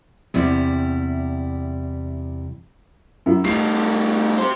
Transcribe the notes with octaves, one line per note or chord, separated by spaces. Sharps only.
E2 C3 G3 E4
F#2 E4
A2 G3 C7
G4 C5